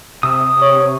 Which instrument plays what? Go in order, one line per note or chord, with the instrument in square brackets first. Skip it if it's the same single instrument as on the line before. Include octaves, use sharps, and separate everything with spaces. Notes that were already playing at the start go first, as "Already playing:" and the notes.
[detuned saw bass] C3 [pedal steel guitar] D#6 E6
[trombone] C#5